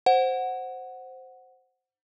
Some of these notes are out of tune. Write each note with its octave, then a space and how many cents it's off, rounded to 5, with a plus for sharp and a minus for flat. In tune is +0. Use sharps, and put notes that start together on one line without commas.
C5 +0 F#5 +0